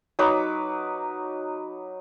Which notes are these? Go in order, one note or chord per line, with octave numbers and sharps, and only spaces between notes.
F#3 D#4 B4 D6